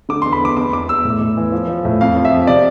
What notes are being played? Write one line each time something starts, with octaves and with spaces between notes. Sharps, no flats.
D3 D6
E2 C6
B5
E2 D6
E2 D6
E2 D6
E2 E6
A2
A2
E3
F3
F3
A2
F2 F5
F3
E5
F2
C3 D5